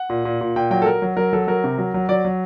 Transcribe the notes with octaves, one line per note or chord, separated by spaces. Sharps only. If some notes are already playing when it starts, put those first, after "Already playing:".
Already playing: F#5
A#2
A#2
A#2
A#2 G5
F#3 G5
A4
F#3 A#4
F#3
F#3 A#4
F#3 A4
F#3 A#4
C3
F#3
F#3
F#3 D5
F#3